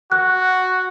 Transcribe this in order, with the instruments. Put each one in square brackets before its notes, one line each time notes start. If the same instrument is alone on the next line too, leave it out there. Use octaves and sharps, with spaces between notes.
[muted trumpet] F#4 [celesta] F#6